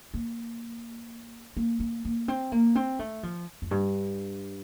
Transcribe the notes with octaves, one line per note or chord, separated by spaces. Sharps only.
A#3
A#3
A#3
A#3
C4
A#3
C4
A3
F3
F2
G2